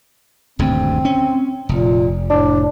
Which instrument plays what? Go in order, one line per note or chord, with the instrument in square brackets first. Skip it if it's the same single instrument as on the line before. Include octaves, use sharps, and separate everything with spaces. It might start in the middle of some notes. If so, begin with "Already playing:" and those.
[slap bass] D#1 D2 G2 [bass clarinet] C4
[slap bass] C#4
[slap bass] F1 [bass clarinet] A#2
[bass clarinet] A2 [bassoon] D4